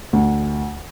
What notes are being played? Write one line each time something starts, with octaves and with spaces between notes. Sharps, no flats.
D2